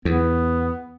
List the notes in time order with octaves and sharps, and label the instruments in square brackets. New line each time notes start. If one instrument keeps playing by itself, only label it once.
[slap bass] E2 [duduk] B3